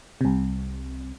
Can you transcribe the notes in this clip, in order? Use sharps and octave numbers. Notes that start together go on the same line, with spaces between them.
C2 C3